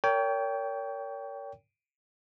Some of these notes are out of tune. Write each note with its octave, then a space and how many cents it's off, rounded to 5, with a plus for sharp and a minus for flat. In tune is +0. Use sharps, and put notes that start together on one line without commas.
A#4 -20 C#5 +35 G5 +0